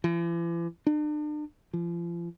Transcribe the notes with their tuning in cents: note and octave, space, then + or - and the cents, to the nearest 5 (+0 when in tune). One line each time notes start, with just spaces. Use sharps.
E3 +45
D4 +40
F3 -35